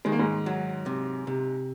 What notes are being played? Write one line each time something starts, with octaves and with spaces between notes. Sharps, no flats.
D#3 G#3
A#3
G#2 G#3
F#3
C3
C3